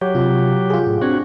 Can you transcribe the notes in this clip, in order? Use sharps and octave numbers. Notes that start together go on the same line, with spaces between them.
F#3 G4 C#5
C3 F4
F4 G#4
A2
C4 D4 F#4 G#6